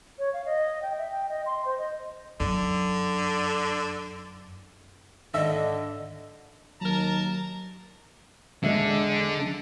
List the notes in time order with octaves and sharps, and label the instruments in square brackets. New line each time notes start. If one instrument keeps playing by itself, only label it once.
[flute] C#5
F5
D#5
G5
E5
G5
D#5
C6
C5
D#5
[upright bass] F#2 [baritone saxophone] D3
[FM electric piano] G#2 D#3 [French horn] D3 [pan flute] D#5 [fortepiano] E5
[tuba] D#2 [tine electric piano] F#3 [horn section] A#4 A5 A#5
[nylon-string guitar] E2 G#3 E5 [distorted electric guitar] D3